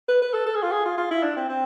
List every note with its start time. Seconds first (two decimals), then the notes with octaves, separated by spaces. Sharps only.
0.08 B4
0.22 B4
0.34 A4
0.46 A4
0.55 G#4
0.63 F4
0.72 G#4
0.86 F4
0.98 F4
1.11 E4
1.23 D4
1.36 C4
1.49 C4